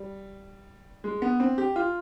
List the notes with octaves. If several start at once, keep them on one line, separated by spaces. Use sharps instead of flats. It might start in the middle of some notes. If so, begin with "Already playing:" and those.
Already playing: G3
G#3
B3
C4
G4
F4